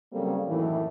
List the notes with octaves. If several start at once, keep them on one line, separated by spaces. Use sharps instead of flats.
C#3 F#3 G3 A#3 C4 A4
F#2 A2 D#3 E3